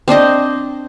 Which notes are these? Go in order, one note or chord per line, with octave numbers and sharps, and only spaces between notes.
C4 D4 C5 D#5